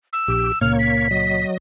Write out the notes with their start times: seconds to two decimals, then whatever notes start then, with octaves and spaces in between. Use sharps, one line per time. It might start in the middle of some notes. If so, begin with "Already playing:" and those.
0.13 E6
0.28 A#1 G4
0.61 C#2 A#2 A#3 C#5 F6
0.79 B6
1.11 F#3 D#5